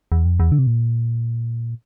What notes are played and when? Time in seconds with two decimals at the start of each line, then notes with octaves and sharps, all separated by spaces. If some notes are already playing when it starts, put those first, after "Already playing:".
0.12 E2
0.25 F2
0.40 E2
0.52 D3
0.59 C3
0.67 A#2